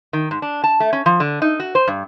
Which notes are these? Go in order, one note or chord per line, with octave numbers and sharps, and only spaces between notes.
D#3
G#2
D4
A5
A3
C#4
F3
D3
D#4
F#4
C5
G2